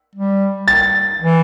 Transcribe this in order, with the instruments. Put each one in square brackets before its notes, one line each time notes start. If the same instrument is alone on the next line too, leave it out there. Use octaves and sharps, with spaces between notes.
[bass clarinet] G3
[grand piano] A6
[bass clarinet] E3